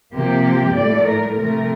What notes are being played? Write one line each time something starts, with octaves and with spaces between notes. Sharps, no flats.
C3 F3 A#3 G4
A2 A3 D5
A#4
C3 F3 A3 A#4